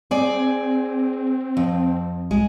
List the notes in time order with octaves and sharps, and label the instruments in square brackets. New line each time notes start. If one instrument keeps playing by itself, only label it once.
[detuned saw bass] C4 [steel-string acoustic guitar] G#4 D5
[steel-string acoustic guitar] F2
[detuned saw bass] B1 [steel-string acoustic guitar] G#3